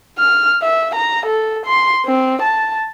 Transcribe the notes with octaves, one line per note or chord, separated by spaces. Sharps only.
F6
E5
A#5
A4
C6
C4
A5